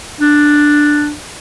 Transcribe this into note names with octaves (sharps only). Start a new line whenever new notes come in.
D4